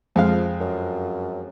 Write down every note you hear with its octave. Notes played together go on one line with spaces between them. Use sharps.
F2 F3 G#3 F5
F#2